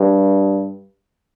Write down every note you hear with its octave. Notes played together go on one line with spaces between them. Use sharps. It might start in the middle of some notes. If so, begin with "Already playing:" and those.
Already playing: G2